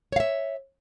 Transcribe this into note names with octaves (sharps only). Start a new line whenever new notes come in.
C#5 E5 F5